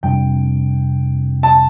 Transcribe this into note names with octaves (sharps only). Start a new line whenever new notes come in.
F2 C3 G3 D4 G5
A5